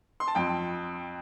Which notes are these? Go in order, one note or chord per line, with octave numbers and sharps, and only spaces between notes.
C6
A5
F2 G5